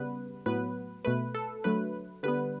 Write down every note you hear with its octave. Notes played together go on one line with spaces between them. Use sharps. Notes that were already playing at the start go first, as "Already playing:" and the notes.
Already playing: C#3 G3 B3 B4
A2 F#3 B3 B4
B2 A3 B4
A4
D3 F#3 A3 B4
D3 G3 B3 B4